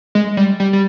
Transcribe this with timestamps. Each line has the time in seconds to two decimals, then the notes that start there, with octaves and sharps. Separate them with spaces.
0.15 G#3
0.37 G3
0.60 G3
0.73 G3